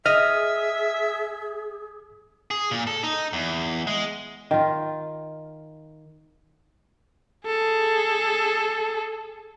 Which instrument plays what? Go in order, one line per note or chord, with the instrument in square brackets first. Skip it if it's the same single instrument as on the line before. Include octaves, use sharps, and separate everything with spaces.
[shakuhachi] G#4 [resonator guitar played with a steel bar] D#5 [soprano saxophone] E5 [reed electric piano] F6
[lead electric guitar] G#4
A#2
A4
D#4
E2
G#3
[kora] D#3 F4
[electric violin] G#4 A4